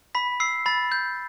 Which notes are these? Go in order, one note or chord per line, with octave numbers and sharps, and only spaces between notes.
B5 B6
E6 C7
B5 A6
G6